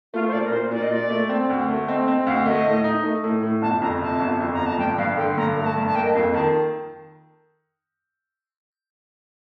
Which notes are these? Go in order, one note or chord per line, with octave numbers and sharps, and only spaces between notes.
A3 F4
C5
A#2 D5
A#4
A#2 C5
A#2 D5
D#5
A#2 D5
A3
C4
D2
A3
C4 D#5
C4 D#5
D2 F5
A3 D#5
A2
D#4
A3
A2
A2
G1 A5
F2 A#5
C3 A5
G1
F2
A#5
G1
A5
G2 G5
G2 F5
D3 G5
G2 A#5
A3
A#5
A5
G2
A5
A#3 G5
D#5
F2 F5
D#3 A5